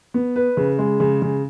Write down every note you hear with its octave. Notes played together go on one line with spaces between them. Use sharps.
B3
B4
C#3
G#3
C#3
C#3